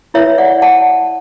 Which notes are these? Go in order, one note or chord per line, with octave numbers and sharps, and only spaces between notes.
E4 B4 C#5 E5
D5 F#5
F#5 A5